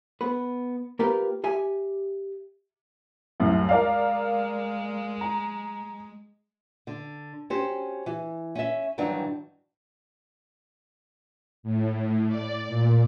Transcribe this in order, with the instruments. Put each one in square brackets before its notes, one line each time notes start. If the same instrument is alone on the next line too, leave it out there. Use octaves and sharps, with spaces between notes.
[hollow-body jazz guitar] B3 B4
A#3 F4 G4 A#4 B4 G5
G4 E5 G#5
[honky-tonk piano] C2 F#2 A2
[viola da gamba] G#3 [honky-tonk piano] A#4 D5 F5
[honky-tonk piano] A#5
[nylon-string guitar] D3
C#4 F#4 G4 C5
E3
C#4 E5
G2 D#3 E3 F#3 D4
[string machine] A2
D5
A#2